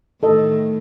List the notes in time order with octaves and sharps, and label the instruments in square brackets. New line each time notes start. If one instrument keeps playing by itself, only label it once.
[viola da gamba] A2 D#3 A3 [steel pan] A4 D#5